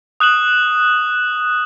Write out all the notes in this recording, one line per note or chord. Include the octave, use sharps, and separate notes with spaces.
D#6 F#6 E7 F#7